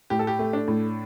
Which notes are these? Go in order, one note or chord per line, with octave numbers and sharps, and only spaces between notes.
A2 G4
A4
G4
A3
D4
A2